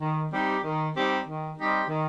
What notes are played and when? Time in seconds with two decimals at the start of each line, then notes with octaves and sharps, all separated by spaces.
0.01 D#3
0.32 G3 C4 D#4 G4
0.64 D#3
0.94 G3 C4 D#4 G4
1.26 D#3
1.57 G3 C4 D#4 G4
1.88 D#3